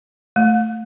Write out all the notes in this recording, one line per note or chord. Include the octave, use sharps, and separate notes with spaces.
A3